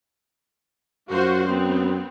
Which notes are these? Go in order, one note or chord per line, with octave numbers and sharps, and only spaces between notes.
F#2 F4 F#4 C5
B3 C4